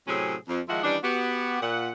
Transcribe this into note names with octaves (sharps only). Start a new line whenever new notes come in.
A2 C3 F#3 C4 C#4 G#4
F2
D#3 F3 G#3 E4 F4 F#5
D#3 E3 G3 C#4 D4
B3 F#4 G4
A#2 F#5